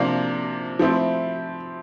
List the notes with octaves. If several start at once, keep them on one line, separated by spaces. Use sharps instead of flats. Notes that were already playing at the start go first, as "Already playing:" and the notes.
Already playing: C3 F3 A#3 D4
F3 A3 C4 E4